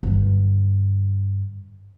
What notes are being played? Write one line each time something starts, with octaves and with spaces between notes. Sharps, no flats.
G2 D3